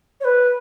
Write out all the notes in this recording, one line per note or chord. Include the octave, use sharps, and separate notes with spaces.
C#5
B4